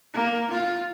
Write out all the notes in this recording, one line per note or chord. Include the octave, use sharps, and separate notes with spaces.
A#3
F4